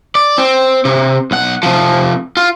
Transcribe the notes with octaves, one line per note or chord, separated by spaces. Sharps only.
D5
C4
C3
B1 F#5
C3 F3
F4